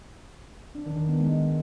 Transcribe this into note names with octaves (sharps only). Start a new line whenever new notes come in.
D4
D#3
D#3
B3
G#3